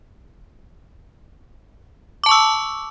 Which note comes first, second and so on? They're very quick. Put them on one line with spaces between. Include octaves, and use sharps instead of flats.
D6 A5 C#6 E6